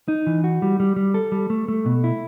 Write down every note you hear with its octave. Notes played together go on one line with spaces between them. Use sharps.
D#4
E3
F#4
G3
G3
G3
A4
G3
A3
A3
B2
E4